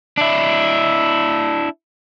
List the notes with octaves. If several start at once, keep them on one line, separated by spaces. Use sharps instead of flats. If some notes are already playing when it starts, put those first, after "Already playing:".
D4 E4